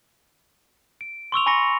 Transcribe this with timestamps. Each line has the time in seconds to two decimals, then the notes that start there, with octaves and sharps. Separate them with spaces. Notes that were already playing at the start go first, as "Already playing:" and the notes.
1.01 D7
1.32 C6 C#6 E6 F7
1.46 G#5 B5 C#6 A#6 C#7